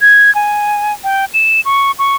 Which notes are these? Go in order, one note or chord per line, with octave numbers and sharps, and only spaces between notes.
G#6
G#5
G5
E7
C#6
C#6